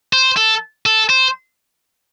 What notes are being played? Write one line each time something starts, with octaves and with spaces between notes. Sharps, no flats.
C5
A4
A4
C5